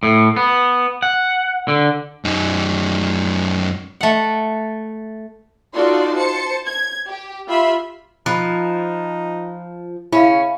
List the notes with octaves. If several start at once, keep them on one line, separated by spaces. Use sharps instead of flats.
A2
B3
F#5
D3
F#2 D#4
A3 F#5
D#4 F4 F#4 A4 D5 C6
C5 A5 C#7
G#6
G4
F4 G4 E5 B5 C6
F3 D#4 B5 F#6
C#3 C#4 E4 F5 B5